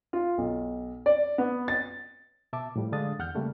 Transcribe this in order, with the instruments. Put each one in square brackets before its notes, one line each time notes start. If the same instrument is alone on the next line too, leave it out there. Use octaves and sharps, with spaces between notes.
[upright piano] F4
B1
D5
B3
A6
[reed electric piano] B2 E5 A5 D6
A2 F3 G3
D3 G#3 D4 F5 D#6 A6
E2 F#5 F6 G6
C#3 G3 A3 A#3